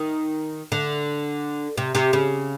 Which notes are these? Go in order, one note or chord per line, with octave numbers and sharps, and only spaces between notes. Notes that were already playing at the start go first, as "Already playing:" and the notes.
Already playing: D#3
D3
C3
C3
C#3